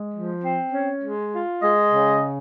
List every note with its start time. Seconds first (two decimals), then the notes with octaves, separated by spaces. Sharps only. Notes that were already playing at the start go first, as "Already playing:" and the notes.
Already playing: G#3
0.13 F3
0.43 C4
0.73 C#4
1.02 G#3
1.33 F4
1.62 G#3 D#5
1.92 C#3